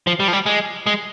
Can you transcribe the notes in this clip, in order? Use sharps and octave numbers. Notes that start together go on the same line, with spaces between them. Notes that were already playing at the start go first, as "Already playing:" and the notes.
F3
G3
F3
G3
G#3
G#3